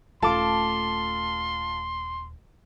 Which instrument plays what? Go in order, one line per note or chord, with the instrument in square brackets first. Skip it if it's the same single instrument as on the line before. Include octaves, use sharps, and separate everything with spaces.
[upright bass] D#1 A3 [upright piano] F4 A4 [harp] A5 D6 [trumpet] C6